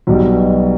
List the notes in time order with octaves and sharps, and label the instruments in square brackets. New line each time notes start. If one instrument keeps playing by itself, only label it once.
[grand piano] B1 B2 G3